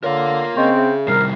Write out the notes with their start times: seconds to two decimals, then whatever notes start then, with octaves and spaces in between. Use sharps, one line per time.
0.04 D3 F4 A#4 C#5 F5
0.56 C#3 C4 D#5 C6 C#6
0.76 G#4 E5
1.08 C3 D#3 G3 A#4 C7